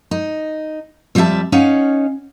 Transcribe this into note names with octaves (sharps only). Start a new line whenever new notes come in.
D#4
F2 G3 D4 F4 E5 A5
C#4 D#4 C#5 F5 F#5